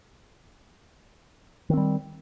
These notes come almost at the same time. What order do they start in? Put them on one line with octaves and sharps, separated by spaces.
D#3 C4 G3